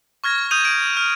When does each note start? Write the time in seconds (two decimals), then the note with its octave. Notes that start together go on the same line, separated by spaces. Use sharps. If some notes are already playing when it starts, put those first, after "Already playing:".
0.24 C#6 F6 G#6 A#6
0.51 D#6 G6 D#7 F7
0.65 D7
0.97 F6